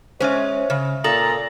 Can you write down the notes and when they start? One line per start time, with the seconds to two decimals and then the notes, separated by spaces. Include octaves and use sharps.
0.20 G#3 C#4 C5 C#5 E5
0.70 C#3
1.04 A#2 A4 A#5 D#6 F#7